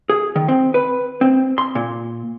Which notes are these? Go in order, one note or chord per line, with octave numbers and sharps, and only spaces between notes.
G#4
D#3
C4
B4
C4
C6
A#2